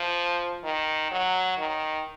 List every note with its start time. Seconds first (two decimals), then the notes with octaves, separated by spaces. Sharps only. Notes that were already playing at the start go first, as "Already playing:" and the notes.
Already playing: F3
0.64 D#3
1.12 F#3
1.58 D#3